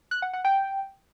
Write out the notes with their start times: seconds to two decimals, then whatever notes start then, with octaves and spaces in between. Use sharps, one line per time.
0.11 F#6
0.22 F#5
0.33 F#5
0.45 G5